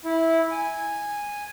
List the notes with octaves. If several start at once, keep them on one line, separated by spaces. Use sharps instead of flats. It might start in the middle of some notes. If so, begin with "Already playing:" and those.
E4
G#5